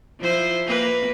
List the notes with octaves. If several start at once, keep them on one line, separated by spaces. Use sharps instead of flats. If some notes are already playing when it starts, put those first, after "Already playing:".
F3 E4 C5
A#3 B4